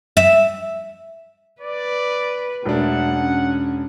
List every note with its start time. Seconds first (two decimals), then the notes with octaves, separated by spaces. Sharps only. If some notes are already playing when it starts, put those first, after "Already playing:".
0.17 E5
1.61 B4 D5
2.66 E1 A3 D4 F#5
3.11 C#4